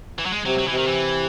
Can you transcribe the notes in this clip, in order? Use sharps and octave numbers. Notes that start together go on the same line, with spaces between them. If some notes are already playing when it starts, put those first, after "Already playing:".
E3
F#3
G#3
C3 F#3
F#3
C3 E3
D#3
E3